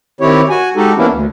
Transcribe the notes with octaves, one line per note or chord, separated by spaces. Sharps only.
D#3 C4 E4 G4 C#5
F#4 G#5
G#3 D#4 F#4 G4 A4
E3 A#3 B3 C#4 D4 E4
D2